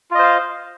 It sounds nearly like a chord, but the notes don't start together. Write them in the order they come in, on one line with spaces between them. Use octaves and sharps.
F4 D#5 C5 F5